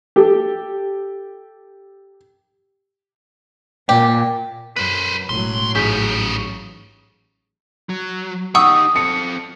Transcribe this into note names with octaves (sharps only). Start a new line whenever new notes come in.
G4 A4
A#2 G4
F#2 B4 C5 F#6
E1 F#2 A2 F#3 C6
A1 G#2 C#3 F3 G6 B6
F#3
D#4 G4 F#5 C#6 D#6 E6
C4 A4 C#7